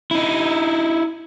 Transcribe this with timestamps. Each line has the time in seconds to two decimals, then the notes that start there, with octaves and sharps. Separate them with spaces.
0.11 D#4 E4